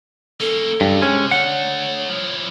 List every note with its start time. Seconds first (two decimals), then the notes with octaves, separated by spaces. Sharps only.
0.40 A#3 C#4 A4
0.81 G2 C#3 F4
1.01 C3 G#3 C#4
1.31 D3 A3 C#5 F#5
2.09 F3 E4